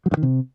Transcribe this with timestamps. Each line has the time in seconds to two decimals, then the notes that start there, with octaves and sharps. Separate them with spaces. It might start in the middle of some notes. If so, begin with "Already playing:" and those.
0.06 F#3
0.11 G2
0.17 D#3
0.23 C3